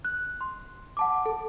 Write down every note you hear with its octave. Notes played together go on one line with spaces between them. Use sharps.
F#6
C6
F#5 A5 D6
A4